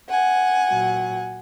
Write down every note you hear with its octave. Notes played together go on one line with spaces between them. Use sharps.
F#5 G#5
A#2 F#3